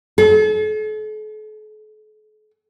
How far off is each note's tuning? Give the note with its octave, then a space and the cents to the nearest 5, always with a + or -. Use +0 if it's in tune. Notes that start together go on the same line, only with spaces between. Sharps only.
A4 -45